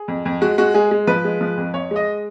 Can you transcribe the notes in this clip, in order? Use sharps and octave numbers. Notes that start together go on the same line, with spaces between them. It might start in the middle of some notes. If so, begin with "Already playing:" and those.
Already playing: G#4
F2
F2
G#3 F#4
G#3 F#4
G#3 G#4
G#3
F3 B4
G#3
F3
F2
F2 C#5
G#3
D#5